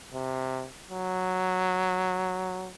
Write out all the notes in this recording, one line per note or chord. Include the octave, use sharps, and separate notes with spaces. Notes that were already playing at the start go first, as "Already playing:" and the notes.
C3
F#3